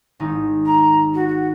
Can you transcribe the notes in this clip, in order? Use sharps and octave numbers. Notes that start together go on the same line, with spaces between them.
G#1 D#4
A#5
F#4
F#4